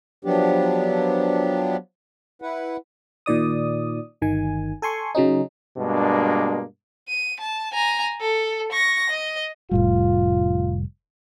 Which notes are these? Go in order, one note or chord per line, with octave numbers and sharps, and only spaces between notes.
F3 F#3 B3 D4 G4
E4 B4 F#5
A#2 D#3 D5 D#6
G1 D#3 G#5
A4 G#5 C6 C#6
C#3 F#3 C#4 D#4
G2 B2 G#3 A#3 D4
D#7
A5
G#5 A#5
A4
C#6 A#6
D#5
F1 A2 G3 F4